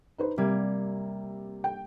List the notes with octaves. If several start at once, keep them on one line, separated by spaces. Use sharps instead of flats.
D#4 B4 C5
C3 G3 A#3 G#6
G5